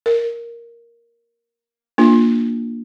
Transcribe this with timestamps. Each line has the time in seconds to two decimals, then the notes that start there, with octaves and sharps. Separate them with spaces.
0.06 A#4
1.98 A#3 D4 F4